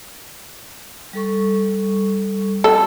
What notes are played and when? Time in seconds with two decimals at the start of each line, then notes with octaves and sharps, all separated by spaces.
1.13 G3 A4 C#6
2.64 A4 D#5